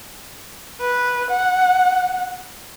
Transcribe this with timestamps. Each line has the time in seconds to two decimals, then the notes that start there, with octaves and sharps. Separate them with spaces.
0.81 B4
1.30 F#5